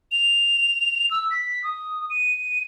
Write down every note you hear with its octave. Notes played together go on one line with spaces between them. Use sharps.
F7
E6
B6
D#6
D#7